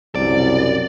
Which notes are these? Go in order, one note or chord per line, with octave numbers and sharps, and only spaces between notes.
C2 F#2 B2 G3 D5